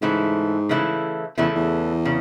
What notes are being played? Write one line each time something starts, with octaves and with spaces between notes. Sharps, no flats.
G#2 C#3 E3 A3 E4
C#3 E3 A3 E4
E2 C#3 E3 A3 E4
E2
C#3